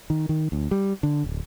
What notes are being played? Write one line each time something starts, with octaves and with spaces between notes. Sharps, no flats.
D#3
D#3
D2
G3
D3
D1